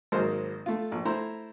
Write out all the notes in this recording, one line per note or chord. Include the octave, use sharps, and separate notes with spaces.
G#1 F#3 G#3 A#3 A#4 C5
A3 F4
A#1
A3 E4 C5 A#5 C6